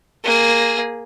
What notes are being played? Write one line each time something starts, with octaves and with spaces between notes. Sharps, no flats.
A#3 G#4